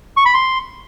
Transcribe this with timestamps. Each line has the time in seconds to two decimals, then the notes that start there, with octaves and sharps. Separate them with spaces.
0.17 C#6
0.26 B5
0.34 C6